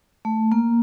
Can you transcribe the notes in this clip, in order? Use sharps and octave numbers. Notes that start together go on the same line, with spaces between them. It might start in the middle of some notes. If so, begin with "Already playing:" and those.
A3
A#3